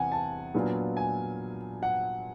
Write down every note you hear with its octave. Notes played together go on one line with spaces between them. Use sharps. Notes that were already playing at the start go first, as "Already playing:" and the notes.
Already playing: E2 C3 F#5 G#5
A5
A#2 F#3 B3 D4 F4
G#5
F#5